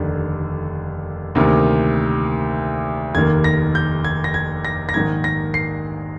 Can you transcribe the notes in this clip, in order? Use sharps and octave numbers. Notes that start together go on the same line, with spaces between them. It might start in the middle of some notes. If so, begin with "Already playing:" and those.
Already playing: F1 D#2 D3
D2 C3 D#3 A#3
F1 D#2 D#3 A#3 G#6
A#6
G6
G#6
A#6
G#6
A#6
A#6
A#1 G#2 D#3 A#3 G#6
A#6
C7